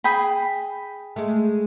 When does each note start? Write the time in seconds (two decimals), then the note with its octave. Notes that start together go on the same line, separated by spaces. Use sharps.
0.04 G#4 G5 B5
1.16 G#3 A3